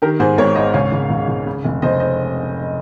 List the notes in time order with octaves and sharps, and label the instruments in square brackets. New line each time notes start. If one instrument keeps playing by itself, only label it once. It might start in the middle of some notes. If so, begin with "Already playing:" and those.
[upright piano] D#3 G4 A#4
G#2 G#4 C5
G#1 A#4 C#5
G#2 C5 D#5
C#2 C#5 F5
C#2
C#2
C#2
C#3
F1
F1 C5 D#5
C5 D#5